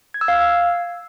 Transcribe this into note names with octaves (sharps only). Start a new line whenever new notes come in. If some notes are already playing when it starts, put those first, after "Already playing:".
G#6
E6
F5